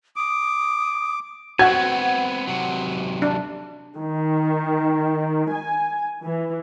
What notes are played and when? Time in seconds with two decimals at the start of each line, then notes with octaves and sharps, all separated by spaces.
0.16 D6 D#6
1.59 B3 C4 F#4 F#5 G#6
2.47 C3 F#3
3.22 D4
3.96 D#3
5.52 G#5
6.23 E3